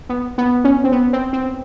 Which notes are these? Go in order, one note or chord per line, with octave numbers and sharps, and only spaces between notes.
B3
B3
C#4
C4
B3
C4
C4